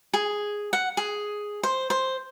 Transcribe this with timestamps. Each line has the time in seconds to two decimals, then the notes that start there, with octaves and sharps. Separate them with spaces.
0.13 G#4
0.73 F#5
0.97 G#4
1.63 C5
1.90 C5